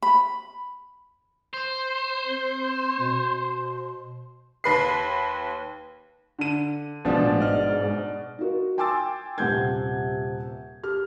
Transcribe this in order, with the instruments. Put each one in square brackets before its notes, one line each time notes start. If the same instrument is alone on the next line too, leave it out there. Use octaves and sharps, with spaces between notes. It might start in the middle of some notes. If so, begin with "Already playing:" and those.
[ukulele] B5
[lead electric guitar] C5
[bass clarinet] C4
B2
[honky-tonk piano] D#2 B4 C7
[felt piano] D3 D#7
[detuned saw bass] A1 [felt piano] B2 D4 [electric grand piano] F3 G#3
[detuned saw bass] G#2 [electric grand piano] D5 D#5 F6
[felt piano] D#4 F4 F#4 A#4
G5 G#5 C6 D6 E6 A6
D#1 C3 F#5 G6 G#6
G4 F6